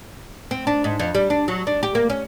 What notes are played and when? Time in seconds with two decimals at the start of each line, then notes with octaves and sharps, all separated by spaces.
0.51 C4
0.67 D4
0.84 G#2
0.99 F2
1.15 G3
1.30 D4
1.48 F#3
1.67 D4
1.83 G4
1.95 A#3
2.10 C#4